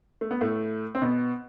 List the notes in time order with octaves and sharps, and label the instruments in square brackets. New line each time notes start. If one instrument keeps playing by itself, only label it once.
[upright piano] A3
B3
A2 A3
C4
B2 B3